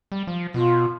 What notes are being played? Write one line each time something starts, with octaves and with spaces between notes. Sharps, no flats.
G3
F3
B2 F4